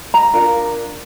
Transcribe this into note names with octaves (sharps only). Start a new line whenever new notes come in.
A#5
D4 F4 A#4